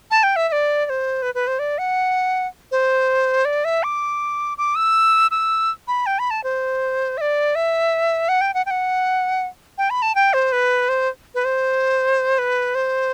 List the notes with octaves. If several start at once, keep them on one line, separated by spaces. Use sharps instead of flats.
A5
G5
E5
E5
D5
D5
C5
B4
B4
C5
D5
F#5
C5
D5
E5
D6
D6
E6
E6
B5
G5
B5
A5
C5
E5
D5
E5
F#5
G5
F#5
G5
F#5
G5
B5
A5
G5
C5
B4
C5
B4
C5
B4
C5